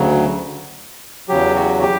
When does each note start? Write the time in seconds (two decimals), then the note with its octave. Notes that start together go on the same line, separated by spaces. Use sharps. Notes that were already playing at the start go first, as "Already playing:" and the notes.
Already playing: D2 C#3 F#3
1.29 E2 C#3 F#3 G4
1.55 F#4
1.82 G4